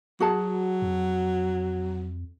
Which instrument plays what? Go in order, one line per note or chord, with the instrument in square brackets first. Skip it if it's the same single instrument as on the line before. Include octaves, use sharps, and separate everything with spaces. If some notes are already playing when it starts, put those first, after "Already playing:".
[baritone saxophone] F#3 [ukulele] F#4 G#4 A5
[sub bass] F2